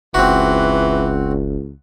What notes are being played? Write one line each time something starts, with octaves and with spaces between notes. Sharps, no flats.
F#1 C#2 E3 C4 F#4